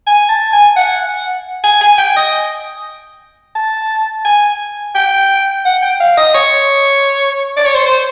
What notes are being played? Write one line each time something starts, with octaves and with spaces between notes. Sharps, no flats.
G#5
A5
G#5
F#5
G#5
G#5
G5
D#5
A5
G#5
G5
F#5
G5
F5
D#5
C#5
D5
C#5
C5
C5